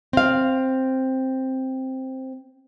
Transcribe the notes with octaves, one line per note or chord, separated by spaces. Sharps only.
C4 F5